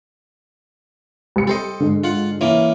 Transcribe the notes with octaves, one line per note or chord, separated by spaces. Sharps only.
C2 C#7
G3 A4 C5 D#5
G#2 D3
F4 F#5
E3 A#3 C#4